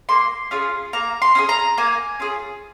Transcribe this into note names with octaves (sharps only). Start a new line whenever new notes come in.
A#3 C6
C#4 F4 G#4
A#3 A#5
C6
C#4 F4 G#4
A#5
A#3 G#5
C#4 F4 G#4